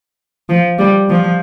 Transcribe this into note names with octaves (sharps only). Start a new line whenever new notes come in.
F3
G3
F3